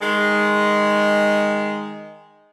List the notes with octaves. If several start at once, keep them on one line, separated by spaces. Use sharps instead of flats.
D#3 G#3